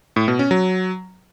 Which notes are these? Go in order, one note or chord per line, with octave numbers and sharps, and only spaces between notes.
A2
B2
C#4
F#3